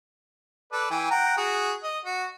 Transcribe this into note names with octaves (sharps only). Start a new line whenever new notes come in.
A4 B4 D5
E3 G5 G#5
F#5 G5 A#5
F#4 G#4
D#5
F#4